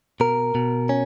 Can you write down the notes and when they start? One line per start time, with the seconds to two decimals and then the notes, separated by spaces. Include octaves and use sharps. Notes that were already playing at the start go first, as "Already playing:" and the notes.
0.20 B2 A#4
0.55 B2
0.89 C#4